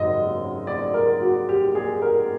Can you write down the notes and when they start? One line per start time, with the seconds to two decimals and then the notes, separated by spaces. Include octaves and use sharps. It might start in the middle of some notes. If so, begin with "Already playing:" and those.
Already playing: G#1 F#2 C#3 D#5
0.67 D5
0.94 A#4
1.22 F#4
1.49 G4
1.75 G#4
2.02 A#4